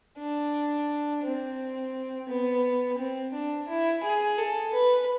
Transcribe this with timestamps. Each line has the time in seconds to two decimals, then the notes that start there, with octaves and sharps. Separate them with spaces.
0.19 D4
1.24 C4
2.28 B3
2.98 C4
3.33 D4
3.69 E4
4.04 G#4
4.38 A4
4.74 B4